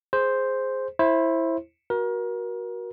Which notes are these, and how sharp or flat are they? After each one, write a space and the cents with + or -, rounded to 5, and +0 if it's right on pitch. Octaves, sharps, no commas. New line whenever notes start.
G#4 +0 C5 +0
E4 +0 C5 +25
F#4 +0 A#4 +30